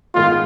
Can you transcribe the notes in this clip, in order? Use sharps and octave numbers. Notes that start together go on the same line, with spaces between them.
G#2 D#3 G#3 B3 F4